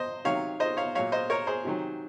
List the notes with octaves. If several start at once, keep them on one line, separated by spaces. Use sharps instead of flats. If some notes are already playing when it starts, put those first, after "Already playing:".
Already playing: C5 D#5
C3 D#3 F#3 C#5 F5
C5 D#5
C#5 F5
A#2 F#3 C#5 F5
C5 D#5
A#4 C#5
G#4 C5
C3 D#3 F#3